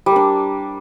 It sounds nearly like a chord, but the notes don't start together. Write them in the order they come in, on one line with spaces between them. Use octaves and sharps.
G3 A#4 D4